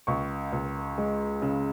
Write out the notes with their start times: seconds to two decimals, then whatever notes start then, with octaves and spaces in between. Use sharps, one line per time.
0.07 C#2 C#6
0.53 C#2
0.98 G#3
1.42 C#3